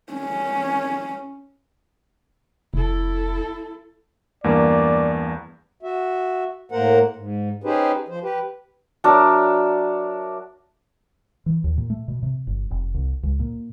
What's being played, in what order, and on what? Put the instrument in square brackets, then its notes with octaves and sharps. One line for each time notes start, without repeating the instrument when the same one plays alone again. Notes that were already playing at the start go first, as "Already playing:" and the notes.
[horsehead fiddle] C#4
[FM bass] F1 [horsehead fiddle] E4 A4
[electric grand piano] E2 G2 A#3 [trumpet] D5
[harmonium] F#4 E5
A2 A#3 A#4 C5 F#5
G#2
C#4 D#4 G4 G#4 B4 C5
F3 C5
G4 B4
[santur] F#3 D4 A#4 E5
[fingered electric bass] E3
D#2
A#2
A3
B2
C3
G1
F1
C2
C#2
A#2